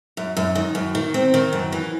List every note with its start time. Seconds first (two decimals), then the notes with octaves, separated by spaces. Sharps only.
0.17 F#2
0.37 F#2
0.55 D#3
0.75 F#2
0.95 D#3
1.14 C4
1.34 D#3
1.53 F#2
1.72 E3